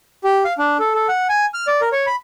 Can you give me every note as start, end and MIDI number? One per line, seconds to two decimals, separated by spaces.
0.24 0.44 67
0.45 0.53 77
0.58 0.77 62
0.79 0.93 69
0.94 1.07 69
1.09 1.27 78
1.29 1.46 80
1.54 1.67 89
1.67 1.81 74
1.81 1.89 70
1.92 2.06 73
2.07 2.16 83